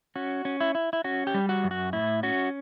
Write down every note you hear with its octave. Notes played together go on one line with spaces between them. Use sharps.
C#4 F#4
C#4
E4
E4
E4
C#4 F#4
G4
G3
F#4
F#2
F#4
A2 E4
C#4 F#4